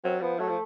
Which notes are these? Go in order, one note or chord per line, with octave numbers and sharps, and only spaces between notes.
F#3 C4
F3 B3
F#3 A3
F3